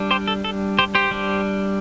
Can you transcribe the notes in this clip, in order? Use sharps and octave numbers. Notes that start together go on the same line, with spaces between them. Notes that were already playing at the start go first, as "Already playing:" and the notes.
Already playing: G3 D4
G4 C5
A4
A4
G4 C5
G4 C5
G3 D4